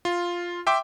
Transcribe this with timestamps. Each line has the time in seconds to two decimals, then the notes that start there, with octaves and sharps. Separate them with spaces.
0.05 F4
0.67 E5 G5 C6 D6